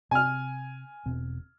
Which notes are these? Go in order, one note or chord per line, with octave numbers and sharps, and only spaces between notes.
C3 C4 G#5 F6
E1 B2 C4